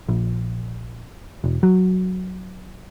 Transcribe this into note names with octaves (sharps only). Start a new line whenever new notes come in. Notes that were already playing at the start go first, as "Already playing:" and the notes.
A#1
E1
F#3